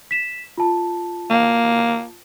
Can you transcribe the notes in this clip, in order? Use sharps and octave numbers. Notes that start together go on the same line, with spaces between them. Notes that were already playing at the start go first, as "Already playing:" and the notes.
B6 E7
F4 A5
A#3